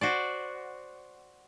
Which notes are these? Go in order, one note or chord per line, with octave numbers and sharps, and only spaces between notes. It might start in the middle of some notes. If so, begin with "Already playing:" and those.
F#4 C5 D5